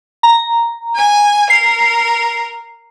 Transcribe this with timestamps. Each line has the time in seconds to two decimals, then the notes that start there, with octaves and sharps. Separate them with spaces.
0.23 A#5
0.95 G#5
1.50 A#4 C7